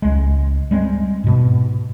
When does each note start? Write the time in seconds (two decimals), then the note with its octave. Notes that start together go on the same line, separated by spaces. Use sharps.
0.02 C#2 G#3
0.71 G3 G#3 C4
1.24 G#2 B2